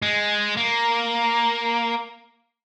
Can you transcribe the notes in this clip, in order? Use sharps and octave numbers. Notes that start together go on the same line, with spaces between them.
G#3
A#3